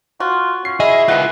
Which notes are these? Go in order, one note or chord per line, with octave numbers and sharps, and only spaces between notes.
F4 F#4
C#4 C7
E4 G#4 D#5 E5
D#3 F4 B4 F#5